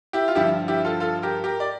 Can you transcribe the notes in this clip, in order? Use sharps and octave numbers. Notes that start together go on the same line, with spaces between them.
E4 G4
F4
G2 D3 F3 E4 G4
E4 G4
F4 A4
F4 A4
G4 A#4
G4 A#4
D5